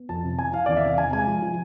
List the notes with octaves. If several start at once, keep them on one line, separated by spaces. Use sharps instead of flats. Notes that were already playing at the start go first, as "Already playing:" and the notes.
Already playing: B3
F2 A5
C3
E3 G#5
E3 F5
E2 D5
E5
C3 F5
C3 G#5
G#3 G#5
F3
F3